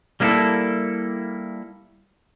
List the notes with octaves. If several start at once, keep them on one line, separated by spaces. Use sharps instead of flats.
G3 A#3 C#4 D4 E4 A4